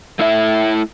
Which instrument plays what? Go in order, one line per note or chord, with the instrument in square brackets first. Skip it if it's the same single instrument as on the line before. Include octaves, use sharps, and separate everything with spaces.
[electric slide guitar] A3 E4 E5